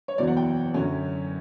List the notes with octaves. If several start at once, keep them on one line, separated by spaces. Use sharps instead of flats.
C#5
F#1 E2 B2 F#3 D5
F#5
G5
F#2 D3 F#3 C#4